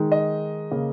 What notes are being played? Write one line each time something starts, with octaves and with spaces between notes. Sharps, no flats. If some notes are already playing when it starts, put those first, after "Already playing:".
Already playing: D#3 G#3 D#4
D#5
C#3 A#3